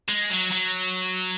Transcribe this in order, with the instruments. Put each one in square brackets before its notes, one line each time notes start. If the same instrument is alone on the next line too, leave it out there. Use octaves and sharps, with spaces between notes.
[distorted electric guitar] G#3
F#3
F#3